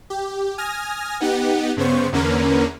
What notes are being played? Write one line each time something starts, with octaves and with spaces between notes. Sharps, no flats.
G4
G#5 D#6 F6 G#6 A#6
B3 D#4 G4 F#5
G2 C#3 B3 C5 C#6
E2 D3 A#3 C#4 A#4 B4